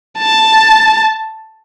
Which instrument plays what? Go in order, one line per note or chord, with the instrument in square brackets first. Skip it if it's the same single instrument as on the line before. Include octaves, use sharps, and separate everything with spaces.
[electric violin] A5